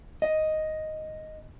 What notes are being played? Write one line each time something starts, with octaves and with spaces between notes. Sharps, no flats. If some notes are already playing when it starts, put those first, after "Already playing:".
D#5